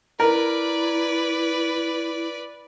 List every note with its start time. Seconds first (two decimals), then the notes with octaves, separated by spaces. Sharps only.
0.20 E4 A#4 B4 D5